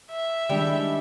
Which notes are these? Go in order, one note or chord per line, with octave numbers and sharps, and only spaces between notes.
E5
D#3 G3 G#3 D4 E4 G4 A4